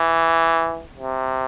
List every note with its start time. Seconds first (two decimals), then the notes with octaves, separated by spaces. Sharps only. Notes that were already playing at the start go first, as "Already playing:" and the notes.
Already playing: E3
0.99 C3